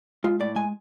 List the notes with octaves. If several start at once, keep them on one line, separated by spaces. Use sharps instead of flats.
G#3 F4
A2 D5
G#3 G#5